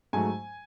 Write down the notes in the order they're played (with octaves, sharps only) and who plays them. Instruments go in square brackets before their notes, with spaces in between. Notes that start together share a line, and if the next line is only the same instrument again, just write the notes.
[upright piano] G#2 F#3 A3 G#5